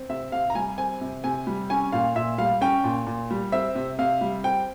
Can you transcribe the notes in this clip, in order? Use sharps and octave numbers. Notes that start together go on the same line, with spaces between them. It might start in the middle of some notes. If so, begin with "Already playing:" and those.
Already playing: C4
C3 E5
C3 F5
A#5
G3 G#5
C4 G#5
C3
C3 G#5
G3
C#4 G#5
A#2 F5
A#2 E5
G3 F5
C#4 G5
A#2
A#2
G3
C4 E5
C3
C3 F5
G3
C4 G5